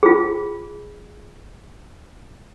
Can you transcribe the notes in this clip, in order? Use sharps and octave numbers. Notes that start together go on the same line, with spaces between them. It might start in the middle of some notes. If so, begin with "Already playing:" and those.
F4 G#4